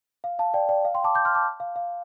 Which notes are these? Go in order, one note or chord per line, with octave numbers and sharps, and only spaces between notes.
F5
F5 A5
D5 G5
D5 G5
F5
G5 C6
A5 D6
D6 G6
C6 F6
A5 D6
F5
F5